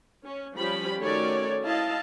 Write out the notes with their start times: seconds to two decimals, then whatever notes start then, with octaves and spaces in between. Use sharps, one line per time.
0.25 C#4
0.56 F3 G3 C#4 G4 B5
1.00 D#3 A3 C#4 F#4 C#5 D5
1.62 E4 D#5 F5 A5